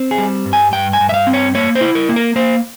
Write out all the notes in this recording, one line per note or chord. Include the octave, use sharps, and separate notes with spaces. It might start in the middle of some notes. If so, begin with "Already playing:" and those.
Already playing: C4
G#4
G3
G2
G#5
G2 G5
G#5
G2
E5
F5
C4
C#5
A#3 C#5
C5
E4
A#4
A#3
A#4
A#3 C5